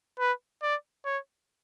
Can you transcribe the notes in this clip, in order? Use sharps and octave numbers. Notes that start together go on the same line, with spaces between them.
B4
D5
C#5